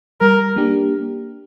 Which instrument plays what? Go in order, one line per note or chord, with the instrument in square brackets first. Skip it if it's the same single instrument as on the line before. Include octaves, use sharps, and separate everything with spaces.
[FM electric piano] G3 [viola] A#4
[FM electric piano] A#3 D4 G4